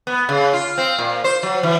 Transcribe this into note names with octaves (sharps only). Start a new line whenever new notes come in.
B3
C#3
F4
C4
A#2
C5
F#3
E3